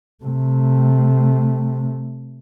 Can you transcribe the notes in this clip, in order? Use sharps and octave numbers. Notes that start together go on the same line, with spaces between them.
C3 A3